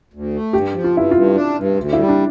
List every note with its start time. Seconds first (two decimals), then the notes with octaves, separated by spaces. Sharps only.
0.14 D2
0.33 A3
0.53 G2 G4
0.74 F3
0.84 F4
0.94 G2 E4
1.11 G2 F4
1.35 D4
1.57 G2
1.76 D2
1.93 G3 E4
2.08 D4